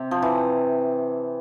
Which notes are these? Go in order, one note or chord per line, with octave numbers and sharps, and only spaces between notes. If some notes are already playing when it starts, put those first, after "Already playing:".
Already playing: C3
F3
E3